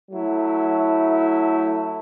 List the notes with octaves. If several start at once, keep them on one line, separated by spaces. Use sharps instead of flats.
F#3 A3 E4